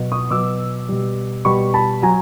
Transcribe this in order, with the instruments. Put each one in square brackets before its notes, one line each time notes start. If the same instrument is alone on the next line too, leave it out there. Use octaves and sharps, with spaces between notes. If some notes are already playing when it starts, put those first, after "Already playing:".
Already playing: [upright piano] B2 F#3
C#6 D#6
B2 F#3 D6 E6
B2 G3
B2 G3 B5 C#6
A5 B5
F#3 G#5 A#5